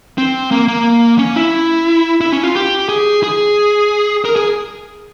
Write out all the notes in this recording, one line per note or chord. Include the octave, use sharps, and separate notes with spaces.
C4
A#3
A#3
C#4
E4
E4
C#4
F4
G4
G#4
G#4
A#4
G#4